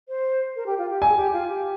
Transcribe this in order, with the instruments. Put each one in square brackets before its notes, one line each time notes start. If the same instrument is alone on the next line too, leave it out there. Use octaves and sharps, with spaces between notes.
[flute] C5
A#4
G4
F4
G4
[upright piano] G#5
[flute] G#4
G4
F4
G4